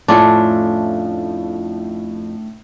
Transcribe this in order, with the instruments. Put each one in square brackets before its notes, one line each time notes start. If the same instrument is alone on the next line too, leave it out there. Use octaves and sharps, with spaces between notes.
[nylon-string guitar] F2 F4 [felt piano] A2 [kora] A3 C#4 D4